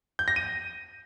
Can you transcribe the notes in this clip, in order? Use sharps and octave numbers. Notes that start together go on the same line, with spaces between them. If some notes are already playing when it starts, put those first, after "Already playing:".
G6
A#6
D#7